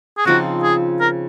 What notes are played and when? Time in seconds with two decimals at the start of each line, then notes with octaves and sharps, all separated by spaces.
0.18 G#4
0.25 C#3 F3 C4 D#4 F#4
0.63 G#4
1.01 A#4